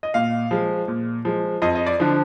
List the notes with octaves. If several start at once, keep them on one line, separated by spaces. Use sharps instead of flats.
D#5
A#2 F5
F3 G#3
A#2
F3 G#3
F2 D#5
D#5
D5
D3 F3